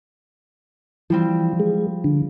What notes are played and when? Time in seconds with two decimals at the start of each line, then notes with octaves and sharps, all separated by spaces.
1.10 E3 F3 G3 C4
1.60 G#3
2.04 D3